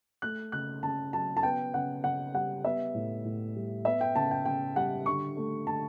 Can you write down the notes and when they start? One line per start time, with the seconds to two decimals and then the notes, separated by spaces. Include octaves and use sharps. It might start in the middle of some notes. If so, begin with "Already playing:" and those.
0.22 A3 F#6
0.52 C#3 F#6
0.83 C#3 A5
1.13 F#3 A5
1.37 A5
1.43 B3 G5
1.74 C#3 F#5
2.04 C#3 F#5
2.34 G3 F#5
2.64 B3 E5
2.95 A2
3.25 A2
3.56 G3
3.85 B3 E5
4.01 G5
4.16 C#3 A5
4.31 G5
4.45 C#3 G5
4.76 G3 F#5
5.06 D3 C#6
5.37 A3
5.67 D3 A5